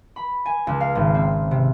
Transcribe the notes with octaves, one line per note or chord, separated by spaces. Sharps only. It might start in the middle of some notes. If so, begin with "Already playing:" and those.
B5
G#5
C#2
F5
G#1
C4
C3